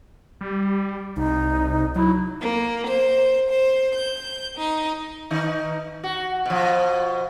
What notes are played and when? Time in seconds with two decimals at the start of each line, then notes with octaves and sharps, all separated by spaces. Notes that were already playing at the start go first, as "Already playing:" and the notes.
0.41 G3
1.17 C2 D#4
1.96 F#3 E4
2.40 A#3
2.87 C5
3.50 C5
3.95 G6
4.57 D#4
5.31 D#3 D#4
6.04 F#4
6.46 B2 F3